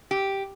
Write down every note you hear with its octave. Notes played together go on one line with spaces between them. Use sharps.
G4